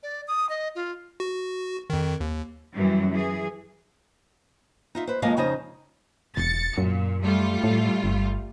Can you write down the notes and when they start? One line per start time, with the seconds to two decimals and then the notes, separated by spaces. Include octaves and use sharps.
0.03 D5
0.28 D#6
0.49 D#5
0.75 F4
1.20 F#4
1.90 F2 D#3
2.21 D#2
2.72 F#2 E3 F#3 G3
3.10 E3 G#4
4.95 D#4 F4 E5
5.07 B4 C5
5.22 D#2 F3 G#3 A#3 D#5 F5
5.37 F2 C#3 D#4 C5 D#5
6.37 E1 A6 C#7
6.78 F#2 A#2
7.22 G3 A3 F4
7.64 A2
8.04 G1